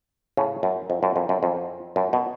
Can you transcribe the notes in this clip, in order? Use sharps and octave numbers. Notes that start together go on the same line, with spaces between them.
A2 C#3
F#2
F2
F#2
F2
F#2
F2
F#2
B2